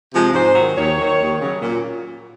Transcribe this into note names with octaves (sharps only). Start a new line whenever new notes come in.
C3 F3 G#3
G#2 C5
D#3 F#3
D#2 C#5
D#3 F#3
D#2
C#3 F#3
A#2